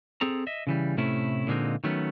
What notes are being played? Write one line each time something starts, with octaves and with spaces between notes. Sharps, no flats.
C4 G#4 A4 A#5
D#5 E5
C#3 E3 G3
A2 C3 A3 C#4 E4
A#2 D3 G#3 A#3 C4 D#4
D#3 F#3 A3 B3 C#4